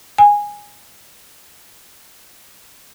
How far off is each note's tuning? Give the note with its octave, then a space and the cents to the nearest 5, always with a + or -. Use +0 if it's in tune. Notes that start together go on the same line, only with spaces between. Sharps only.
G#5 -10